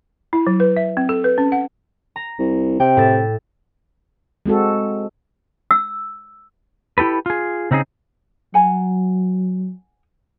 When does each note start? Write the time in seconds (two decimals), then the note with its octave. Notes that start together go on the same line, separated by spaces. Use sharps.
0.33 E4
0.47 F#3
0.60 B4
0.77 E5
0.97 C4
1.09 A4
1.24 B4
1.38 C#4
1.52 F#5
2.16 A#5
2.39 C2
2.80 C3 G5
2.97 A2 E5 A6
4.46 G#3 C4 F#4 A4
5.71 E6
6.98 E4 G4 A4 B4
7.26 F4 G#4
7.71 C#3 C4 D#4 F#4 G#4
8.54 F#3 F#5 G#5 A#5